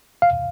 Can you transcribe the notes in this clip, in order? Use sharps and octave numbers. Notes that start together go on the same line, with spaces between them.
F5